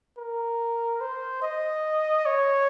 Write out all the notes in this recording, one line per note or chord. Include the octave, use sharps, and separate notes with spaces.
A#4
C5
D#5
C#5